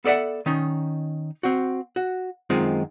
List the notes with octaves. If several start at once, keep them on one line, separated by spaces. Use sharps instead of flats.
B3 A4 D5 E5 F#5
D#3 C#4 D#4
C4 F#4
F#4
F#2 D#3 G#3 C4 F4